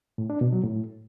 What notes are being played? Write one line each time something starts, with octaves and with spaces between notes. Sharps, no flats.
A2
D4
B2
F#3
A2